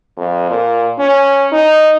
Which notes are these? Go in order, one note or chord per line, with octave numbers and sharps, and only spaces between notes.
F2
A#2
C#4
D#4